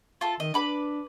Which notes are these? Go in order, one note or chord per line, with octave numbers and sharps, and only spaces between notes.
F4 A4
D#3 D#5
D4 B4 B5 D6